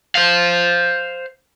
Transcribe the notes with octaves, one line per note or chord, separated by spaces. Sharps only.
C5 F5